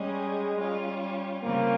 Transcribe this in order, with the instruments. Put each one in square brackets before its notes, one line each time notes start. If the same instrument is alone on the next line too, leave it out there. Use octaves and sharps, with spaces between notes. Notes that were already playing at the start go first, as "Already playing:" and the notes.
Already playing: [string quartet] G3 C#4 G#4 [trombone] G#3
[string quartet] G3 C#4 F4
[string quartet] C#3 G3 C4 F4 [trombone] A#3